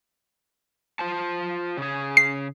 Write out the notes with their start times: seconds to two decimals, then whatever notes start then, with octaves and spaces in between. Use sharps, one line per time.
0.99 F4 C5 A5
1.77 C#3 G#4
2.17 C7